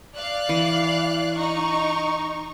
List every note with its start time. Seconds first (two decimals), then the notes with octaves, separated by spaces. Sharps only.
0.16 D5 F5 F#6
0.49 E3
1.35 D#4 C#6